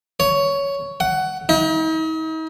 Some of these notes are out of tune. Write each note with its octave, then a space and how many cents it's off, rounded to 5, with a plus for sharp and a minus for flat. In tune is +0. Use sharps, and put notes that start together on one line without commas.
C#5 +10
F#5 +15
D#4 +40